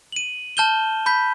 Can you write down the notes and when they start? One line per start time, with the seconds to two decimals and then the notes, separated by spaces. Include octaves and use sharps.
0.12 D#7 F#7
0.57 A5 F6 G6 E7 G7
1.06 B5 G6 B6